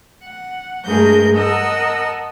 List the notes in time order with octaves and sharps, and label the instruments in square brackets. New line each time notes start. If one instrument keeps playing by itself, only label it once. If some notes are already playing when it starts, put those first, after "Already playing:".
[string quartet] F#5
G2 G#3 A3 G#4 A#4 G6
A#4 D#5 F#5 A5 E6